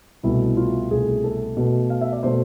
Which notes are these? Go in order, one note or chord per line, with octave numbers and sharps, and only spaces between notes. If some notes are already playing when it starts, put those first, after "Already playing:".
C2 B2 A3 E4
F4
C2 B2 A3 G#4
A4
B2 A3
F5
E5
D5
B2 A3 C5